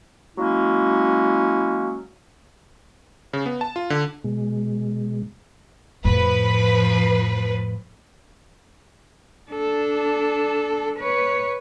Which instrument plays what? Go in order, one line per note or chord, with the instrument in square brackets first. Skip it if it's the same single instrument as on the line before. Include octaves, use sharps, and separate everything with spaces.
[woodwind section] F#3 G#3 A#3 C#4 E4
[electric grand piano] C#3
B3
A5
F4
D3
[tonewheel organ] B2 G#3
[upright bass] F2 A2 [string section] F3 B4
[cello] D4 A4
B4 C#5